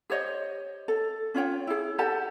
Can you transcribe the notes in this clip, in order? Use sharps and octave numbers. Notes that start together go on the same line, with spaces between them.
G4 C5 C#5 D#5
A4
C#4 F4 C#5 G5
E4 G#4
G4 A4 F#5 A5